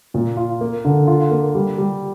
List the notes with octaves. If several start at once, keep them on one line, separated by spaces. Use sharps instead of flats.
A#2
F4
A#3
D3
F4
A#3
G3
G3